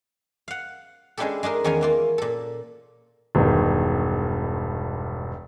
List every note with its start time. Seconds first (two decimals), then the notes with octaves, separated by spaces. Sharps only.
0.48 F5 F#5
1.17 G#3 C#4 D4 E4 G4 A4
1.43 G#3 D4 D#4 A#4
1.64 E2 D#3 C#4 F5 G#5 A#5
1.81 E3 A#3 F4
2.18 A#2 A4
3.35 E1 G2 D#3